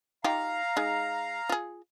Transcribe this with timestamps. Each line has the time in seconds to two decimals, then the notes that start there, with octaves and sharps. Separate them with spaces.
0.24 D#4 F4 G4 F5 A#5
0.77 G#3 D#4
1.49 F4 G#4